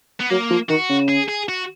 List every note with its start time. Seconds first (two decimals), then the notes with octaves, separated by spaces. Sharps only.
0.20 B3
0.30 F#3 A#3
0.50 F3
0.69 D#3 F#4
0.89 C#3
1.09 G#4
1.29 G#4
1.49 F#4